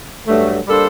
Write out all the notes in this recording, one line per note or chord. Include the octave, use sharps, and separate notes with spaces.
G2 F#3 A3
G3 A#3 D4 A4 C5